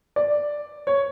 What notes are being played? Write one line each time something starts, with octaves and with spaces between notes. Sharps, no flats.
D5
C#5